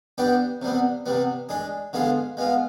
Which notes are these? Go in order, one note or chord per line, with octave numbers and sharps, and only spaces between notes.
G3 B3 D4 G4
C3 G3 B3
C3 G3 B3
G#3 D4 G#4
D3 G#3 B3 F4 G#4
G#3 B3 F4